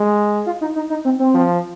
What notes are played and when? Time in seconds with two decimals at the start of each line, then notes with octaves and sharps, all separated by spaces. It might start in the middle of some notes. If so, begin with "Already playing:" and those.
Already playing: G#3
0.46 F4
0.61 D#4
0.76 D#4
0.90 D#4
1.05 C4
1.19 C4
1.34 F3